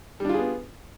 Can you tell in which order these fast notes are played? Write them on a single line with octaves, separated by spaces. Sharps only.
G3 D4 F4 G#4 B3